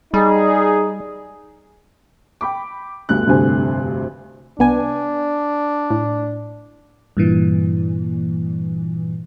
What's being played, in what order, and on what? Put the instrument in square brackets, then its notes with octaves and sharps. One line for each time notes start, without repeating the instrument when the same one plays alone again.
[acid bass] G3 [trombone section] D#4 G#4
[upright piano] G5 B5 D6
G1 D2 G2 F#6
F1 D2 G2 C3 C5 G#5
[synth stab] C2 B3 G#5 [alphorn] D4
[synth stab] A2
[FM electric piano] G2 A#2 E3